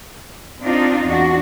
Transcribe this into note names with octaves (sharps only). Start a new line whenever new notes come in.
C4 D4 D#4 F4
E2 D4 F#4